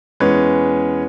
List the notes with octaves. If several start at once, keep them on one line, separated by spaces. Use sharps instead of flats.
E2 G#3 C#4 B4 C#5